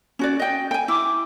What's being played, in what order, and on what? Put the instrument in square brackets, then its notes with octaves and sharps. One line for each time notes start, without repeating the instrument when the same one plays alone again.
[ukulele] C#4 F#4 D5
D#5 G5
G5 G#5
[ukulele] E4 [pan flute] D6